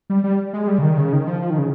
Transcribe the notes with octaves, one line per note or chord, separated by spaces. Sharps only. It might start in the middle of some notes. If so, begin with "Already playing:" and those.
G3
G3
G#3
G3
C#3
D#3
C#3
D#3
F3
F3
D#3
C#3